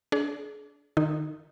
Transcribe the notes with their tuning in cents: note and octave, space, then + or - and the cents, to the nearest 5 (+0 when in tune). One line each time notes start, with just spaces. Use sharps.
D4 -25 G#4 +35
D#3 -30 D#4 -5